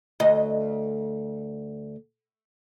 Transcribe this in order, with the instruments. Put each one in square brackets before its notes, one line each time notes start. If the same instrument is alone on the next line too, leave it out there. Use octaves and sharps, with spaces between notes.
[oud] D2 D#5